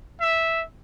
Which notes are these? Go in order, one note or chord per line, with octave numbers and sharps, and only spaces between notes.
E5